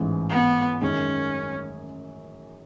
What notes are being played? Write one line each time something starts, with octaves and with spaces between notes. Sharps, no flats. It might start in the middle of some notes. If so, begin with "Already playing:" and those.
Already playing: A1 G#2 E3
B3
F#2 D#3 G#3 C#4